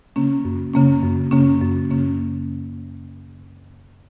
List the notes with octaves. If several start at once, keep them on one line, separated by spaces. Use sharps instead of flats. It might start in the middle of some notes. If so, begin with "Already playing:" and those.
C#3 A#3 C#4
F#2
C#3 A#3 C#4
F#2
C#3 A#3 C#4
F#2
C#3 A#3 C#4